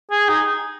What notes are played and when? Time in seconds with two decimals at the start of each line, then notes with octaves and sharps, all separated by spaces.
0.11 G#4
0.29 D#4